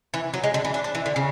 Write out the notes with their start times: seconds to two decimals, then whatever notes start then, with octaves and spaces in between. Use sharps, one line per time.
0.14 E3
0.34 F#3
0.43 G#3
0.54 D3
0.65 E3
0.74 D4
0.84 D4
0.95 E3
1.06 D3
1.16 C#3